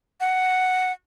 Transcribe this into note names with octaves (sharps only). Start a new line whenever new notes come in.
F#5